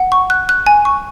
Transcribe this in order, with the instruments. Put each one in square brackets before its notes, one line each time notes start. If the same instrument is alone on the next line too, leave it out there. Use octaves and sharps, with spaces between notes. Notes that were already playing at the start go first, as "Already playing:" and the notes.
Already playing: [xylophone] F#5
C#6
F#6
F#6
G#5
C#6